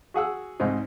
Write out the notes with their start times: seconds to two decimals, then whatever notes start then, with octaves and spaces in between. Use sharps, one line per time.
0.14 F#4 G#4 F#5 E6
0.60 C2 G#2 C4 D#4